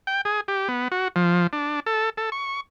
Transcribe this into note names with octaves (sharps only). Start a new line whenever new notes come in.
G5
G#4
G4
B3
F#4
F3
D4
A4
A4
C#6